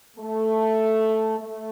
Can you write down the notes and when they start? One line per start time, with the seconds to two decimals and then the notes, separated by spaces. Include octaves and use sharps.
0.17 A3
1.38 A3